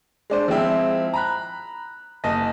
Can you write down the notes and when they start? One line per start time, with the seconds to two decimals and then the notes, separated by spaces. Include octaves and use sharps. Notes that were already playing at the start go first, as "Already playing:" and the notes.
0.30 G#3 D4 C5
0.48 F3 G#3 C4 E4
1.14 A#5 B5 F#6
2.24 F#1 D#5 A5